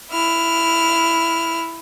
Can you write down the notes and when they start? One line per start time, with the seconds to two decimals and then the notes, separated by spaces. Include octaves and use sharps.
0.11 E4 F6